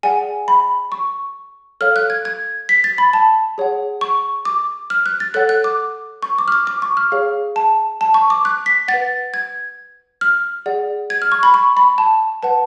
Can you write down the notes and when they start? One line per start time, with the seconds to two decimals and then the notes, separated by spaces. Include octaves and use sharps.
0.03 G#4 D5 F#5 G#5
0.48 B5
0.92 C#6
1.81 A4 C#5 F5 F6
1.96 F#6
2.10 G#6
2.25 G#6
2.69 B6
2.84 A6
2.98 B5
3.13 A5
3.58 G#4 C#5 F#5
4.01 C#6
4.45 D6
4.90 F6
5.06 F#6
5.20 A6
5.34 A4 C#5 F#5 F#6
5.49 F#6
5.64 D6
6.23 C#6
6.38 D6
6.48 F6
6.52 D6
6.67 D6
6.82 C#6
6.97 F6
7.12 G#4 C#5 F5
7.56 A5
8.01 A5
8.14 C#6
8.30 D6
8.45 F#6
8.66 B6
8.88 F#5 A6
8.94 B4
9.34 G#6
10.21 F6
10.66 G#4 D5 F#5
11.10 G#6
11.22 F6
11.32 C#6
11.43 B5
11.54 C#6
11.77 B5
11.98 A5
12.43 B4 F#5 A5